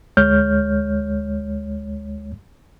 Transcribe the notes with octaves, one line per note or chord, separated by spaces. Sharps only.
D2 G#3 C#5 F6 G6